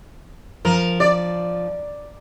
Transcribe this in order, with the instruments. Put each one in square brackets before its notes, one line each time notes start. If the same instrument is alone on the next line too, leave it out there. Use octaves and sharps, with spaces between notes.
[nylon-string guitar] F3 [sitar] A#4
[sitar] D5